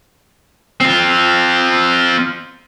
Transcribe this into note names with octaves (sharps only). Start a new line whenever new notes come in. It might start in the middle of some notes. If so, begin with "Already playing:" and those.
C4 F4